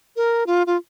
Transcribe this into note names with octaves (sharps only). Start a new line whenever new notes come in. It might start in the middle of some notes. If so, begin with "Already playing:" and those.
A#4
F4
F4